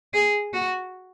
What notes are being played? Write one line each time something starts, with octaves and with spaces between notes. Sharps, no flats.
G#4
F#4